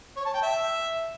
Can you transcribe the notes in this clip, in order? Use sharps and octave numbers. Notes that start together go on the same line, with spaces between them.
C#5
A5
G5
E5